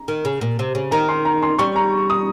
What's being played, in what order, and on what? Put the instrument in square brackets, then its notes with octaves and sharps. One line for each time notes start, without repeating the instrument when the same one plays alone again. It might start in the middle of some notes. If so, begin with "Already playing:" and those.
Already playing: [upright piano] A#5
[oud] D#3
C#3
A#2
C3
C#3
[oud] D#3 [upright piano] A#5
[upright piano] C6
A#5
C6
[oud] G3 [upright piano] C#6
[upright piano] A#5
D#6